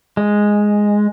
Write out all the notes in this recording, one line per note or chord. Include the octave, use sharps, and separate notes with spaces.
G#3